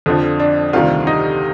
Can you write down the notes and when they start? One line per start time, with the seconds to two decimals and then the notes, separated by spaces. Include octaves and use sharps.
0.06 F2 D3 F3
0.39 D4
0.73 D2 C3 D#3 G3 F4
1.07 D#4